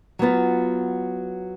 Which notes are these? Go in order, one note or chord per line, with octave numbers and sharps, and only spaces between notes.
F#3 B3 F4